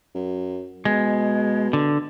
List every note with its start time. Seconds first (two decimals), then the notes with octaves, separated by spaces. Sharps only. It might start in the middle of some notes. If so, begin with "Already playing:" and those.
0.15 F#2
0.85 B2 G#3
1.73 D3